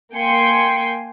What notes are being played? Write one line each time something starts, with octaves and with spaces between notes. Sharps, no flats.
A#3 G5 G#5 C6 C#7